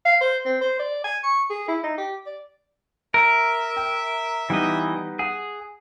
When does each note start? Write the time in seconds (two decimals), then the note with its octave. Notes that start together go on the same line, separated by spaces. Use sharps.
0.05 F5
0.21 C5
0.46 C4
0.61 C5
0.79 D5
1.04 G#5
1.23 C#6
1.50 G#4
1.68 E4
1.83 D#4
1.98 G4
2.26 D5
3.14 A#4 E5
3.77 G5
4.50 E3 G3 B3 D#4 D#5
5.19 G#4 F#5